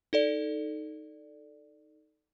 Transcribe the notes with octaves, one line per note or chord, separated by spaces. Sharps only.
D#4 A4 D5